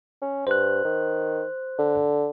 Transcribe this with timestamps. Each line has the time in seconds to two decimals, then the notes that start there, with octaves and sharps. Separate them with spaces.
0.21 C#4
0.47 G2 C5 F#6
0.84 D#3
1.78 D3